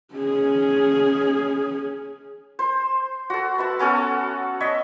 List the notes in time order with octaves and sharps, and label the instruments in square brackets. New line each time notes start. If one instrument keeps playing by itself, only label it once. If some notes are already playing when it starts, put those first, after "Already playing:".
[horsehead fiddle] C#4 G#4
[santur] C5
F#4 A4
B4 E5 A5
B3 C#4 F#4 A4
C#5 D#5 E5